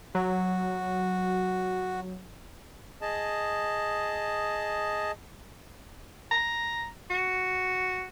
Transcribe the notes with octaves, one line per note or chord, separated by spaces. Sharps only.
F#3 F#4
G#4 D#5 A5
A#5
F#4